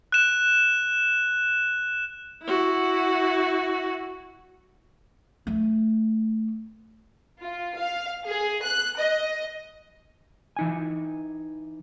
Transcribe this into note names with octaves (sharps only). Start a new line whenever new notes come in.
F#6 E7
E4 F#4
A3
F4
F5
G#4
F#6
D#5
E3 D#4 G#5